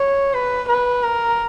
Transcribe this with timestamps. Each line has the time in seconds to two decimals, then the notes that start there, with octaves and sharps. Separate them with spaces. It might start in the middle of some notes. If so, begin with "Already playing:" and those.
Already playing: C#5
0.34 B4
0.68 B4
1.03 A#4